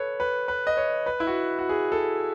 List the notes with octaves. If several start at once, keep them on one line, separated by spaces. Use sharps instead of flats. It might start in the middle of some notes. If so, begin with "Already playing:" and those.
Already playing: A4 B4 C#5
B4
B4
D#5
C#5
B4
E4
F#4
F#4
G#4
A4